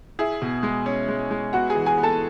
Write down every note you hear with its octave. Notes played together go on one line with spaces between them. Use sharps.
E4 G#4 E5
B2
G#3
C#4
G#3
G#3
B3 F#4 F#5
G#4 G#5
E3
G#4 G#5
B3
A4 A5